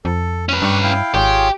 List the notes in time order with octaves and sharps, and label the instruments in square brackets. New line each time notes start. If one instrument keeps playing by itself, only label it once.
[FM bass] F2 [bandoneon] A4
[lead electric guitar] C#4 B4
[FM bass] G2 [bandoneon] G4 C#6 F#6
[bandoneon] E4 F5 G5
[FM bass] G#1 [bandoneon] F4 G#4 C#5 [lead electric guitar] G4